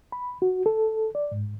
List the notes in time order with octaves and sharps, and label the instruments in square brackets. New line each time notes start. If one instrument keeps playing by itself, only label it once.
[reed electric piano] B5
F#4
A4
D5
G#2